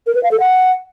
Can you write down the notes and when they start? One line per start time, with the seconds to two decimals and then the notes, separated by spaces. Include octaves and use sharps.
0.07 A#4
0.15 B4
0.23 F5
0.31 A4
0.40 F#5